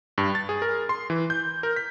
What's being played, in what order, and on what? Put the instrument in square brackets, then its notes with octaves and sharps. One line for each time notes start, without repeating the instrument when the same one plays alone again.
[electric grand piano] G2
A6
G#4
A#4
C6
E3
G6
A#4
B6